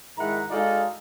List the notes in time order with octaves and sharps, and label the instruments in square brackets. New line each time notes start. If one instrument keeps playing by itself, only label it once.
[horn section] G#2 D#3 E4 F#5 A#5
G#3 D#4 F#4 A4 D5 F5